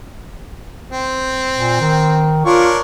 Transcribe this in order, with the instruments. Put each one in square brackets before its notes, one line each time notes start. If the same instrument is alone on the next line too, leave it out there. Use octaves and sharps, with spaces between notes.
[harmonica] C4
[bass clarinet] A#2
D#3
[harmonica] D4 A#4 C#5 [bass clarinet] F4